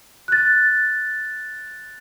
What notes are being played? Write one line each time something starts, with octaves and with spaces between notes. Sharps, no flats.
F#6 A6